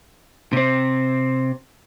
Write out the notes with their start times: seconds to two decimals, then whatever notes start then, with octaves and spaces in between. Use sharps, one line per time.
0.53 C3 C4